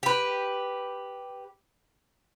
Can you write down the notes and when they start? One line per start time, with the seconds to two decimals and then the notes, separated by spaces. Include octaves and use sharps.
0.03 G4 B4